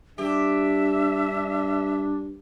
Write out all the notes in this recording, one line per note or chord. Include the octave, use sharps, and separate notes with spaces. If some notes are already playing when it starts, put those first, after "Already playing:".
G2 D4 G4 E5